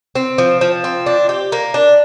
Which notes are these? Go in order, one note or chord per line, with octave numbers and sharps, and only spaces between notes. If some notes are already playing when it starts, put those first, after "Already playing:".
C4
F3
F3
C4
D4
G4
A#3
D4